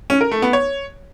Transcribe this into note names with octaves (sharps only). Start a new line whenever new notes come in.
C#4
A#4
A3
B3
C#5